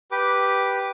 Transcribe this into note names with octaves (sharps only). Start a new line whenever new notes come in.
G4 B4 D6